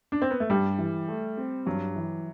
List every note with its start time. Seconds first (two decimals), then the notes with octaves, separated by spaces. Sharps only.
0.12 D4
0.22 C4
0.31 B3
0.40 A3
0.49 G2 G3
0.79 E3
1.08 A3
1.37 C4
1.66 G2 F#3
1.96 E3